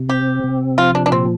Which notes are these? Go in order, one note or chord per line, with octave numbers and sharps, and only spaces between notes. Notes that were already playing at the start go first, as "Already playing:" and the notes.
Already playing: C3
C4 G4
C3
F3 F4
D4
D4
A#2 C4